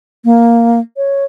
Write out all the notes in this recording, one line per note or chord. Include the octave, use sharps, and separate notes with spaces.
A#3
C#5